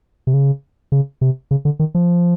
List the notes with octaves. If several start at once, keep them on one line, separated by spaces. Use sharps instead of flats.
C3
C#3
C#3
C3
C#3
D3
D#3
F3